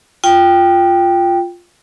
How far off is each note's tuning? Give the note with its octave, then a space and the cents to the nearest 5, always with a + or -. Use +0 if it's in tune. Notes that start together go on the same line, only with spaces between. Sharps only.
F4 +0 G5 +0